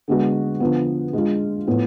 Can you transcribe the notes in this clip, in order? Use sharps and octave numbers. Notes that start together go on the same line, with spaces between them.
D3 G#3 B3 F#4
D3 F3 B3
G#3 D4 F4
A2 F3 B3